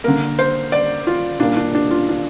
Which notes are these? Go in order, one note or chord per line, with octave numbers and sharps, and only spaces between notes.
D3 A#3 A#4
C5
D5
F4
A#2 G3 A#3 D4
D4
D4
F4
D4